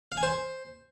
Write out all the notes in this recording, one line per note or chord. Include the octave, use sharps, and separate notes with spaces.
F5
G#5
C5